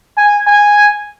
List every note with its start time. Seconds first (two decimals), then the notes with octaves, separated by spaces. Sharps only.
0.17 G#5
0.47 G#5